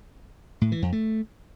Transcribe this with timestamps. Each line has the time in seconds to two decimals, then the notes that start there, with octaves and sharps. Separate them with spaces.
0.61 A2
0.72 E3
0.82 F2
0.92 A3